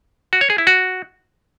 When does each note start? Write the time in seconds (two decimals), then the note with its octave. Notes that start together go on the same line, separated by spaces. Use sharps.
0.33 F#4
0.41 C#5
0.50 G#4
0.58 E4
0.67 F#4